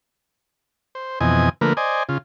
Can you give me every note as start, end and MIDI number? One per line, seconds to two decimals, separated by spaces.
0.95 1.19 72
1.21 1.49 41
1.21 1.49 47
1.21 1.49 52
1.21 1.49 60
1.21 1.49 75
1.21 1.49 80
1.61 1.73 50
1.61 1.73 53
1.61 1.73 57
1.61 1.73 58
1.61 1.73 70
1.61 1.73 71
1.77 2.03 72
1.77 2.03 74
1.77 2.03 75
1.77 2.03 80
2.09 2.18 49
2.09 2.18 65